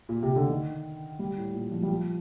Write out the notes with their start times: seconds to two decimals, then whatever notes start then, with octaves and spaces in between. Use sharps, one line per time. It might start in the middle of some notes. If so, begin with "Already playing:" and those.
0.09 A#2
0.23 C3
0.36 D3
0.50 D#3
1.19 G3
1.37 A2
1.54 A#2
1.71 F3
1.83 G3
1.88 F3